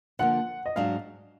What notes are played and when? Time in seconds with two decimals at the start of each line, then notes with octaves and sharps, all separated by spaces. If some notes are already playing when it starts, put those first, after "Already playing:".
0.19 D3 F3 A#3 F#5
0.66 D#5
0.76 G#2 F#3 D4 F5